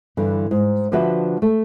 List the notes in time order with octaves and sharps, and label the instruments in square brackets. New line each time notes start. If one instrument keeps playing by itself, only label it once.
[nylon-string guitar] G2 D3 E3
G#2
D3 F3 D4 F#4 B4 E5
A3